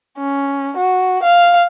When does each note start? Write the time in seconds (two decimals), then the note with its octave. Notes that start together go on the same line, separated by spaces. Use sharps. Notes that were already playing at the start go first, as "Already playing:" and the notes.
0.18 C#4
0.77 F#4
1.23 F5